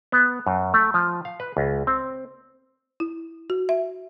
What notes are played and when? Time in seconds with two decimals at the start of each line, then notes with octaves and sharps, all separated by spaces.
0.12 B3
0.47 F#2
0.74 A3
0.94 F3
1.25 F5
1.40 B4
1.57 C#2
1.87 C4
3.00 E4
3.50 F#4
3.69 E5